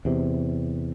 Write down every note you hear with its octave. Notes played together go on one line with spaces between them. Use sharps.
E2 C3